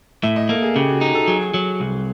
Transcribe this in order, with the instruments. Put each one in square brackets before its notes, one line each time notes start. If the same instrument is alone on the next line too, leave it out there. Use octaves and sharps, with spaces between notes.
[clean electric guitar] A2 [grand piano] E5
[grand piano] D#5
[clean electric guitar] A#3 [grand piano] A4
[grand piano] G#4
[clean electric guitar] C#3 [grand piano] G4
[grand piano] F#4
[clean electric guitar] D#4
[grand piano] G#4
A4
[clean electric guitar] F#3 [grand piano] G#4
[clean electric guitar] F#3
C2